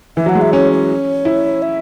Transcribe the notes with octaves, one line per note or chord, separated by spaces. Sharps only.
E3 E5
F#3 F#5
G#3
E5
C#4 C#5
C#5
E4
E5